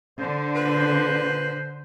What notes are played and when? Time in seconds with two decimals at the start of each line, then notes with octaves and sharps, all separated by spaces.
0.19 D3 C5
0.55 A#2 B4